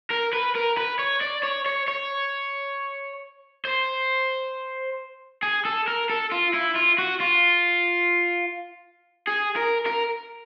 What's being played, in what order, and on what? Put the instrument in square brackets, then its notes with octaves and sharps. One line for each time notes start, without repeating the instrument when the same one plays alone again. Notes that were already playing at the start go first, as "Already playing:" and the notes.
[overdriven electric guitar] A#4
B4
A#4
B4
C#5
D5
C#5
C#5
C#5
C5
G#4
A4
A#4
A4
F4
E4
F4
F#4
F4
G#4
A#4
A#4